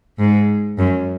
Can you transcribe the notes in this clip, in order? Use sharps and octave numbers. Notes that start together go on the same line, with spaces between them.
G#2
F#2